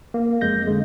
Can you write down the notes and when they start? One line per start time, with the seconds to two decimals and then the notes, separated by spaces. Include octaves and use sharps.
0.14 A#3
0.41 F2 G#3 G6 A#6
0.67 D3 G#3